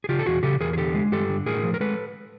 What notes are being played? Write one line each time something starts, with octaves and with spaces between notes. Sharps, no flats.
G#4
C#3 F4 G4
A4
E2 F#4 G#4
C#3 G4 A4
E2 G#4 A#4
G#4
D3 G4 A4
G#3
G2 G4 A4
D3
A2 G#4 A#4
F3
A#4
G#3 A4 B4